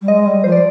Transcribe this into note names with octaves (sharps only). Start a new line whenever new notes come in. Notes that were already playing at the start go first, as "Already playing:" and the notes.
G3
G#3 D#5
G3
F3 C5
D5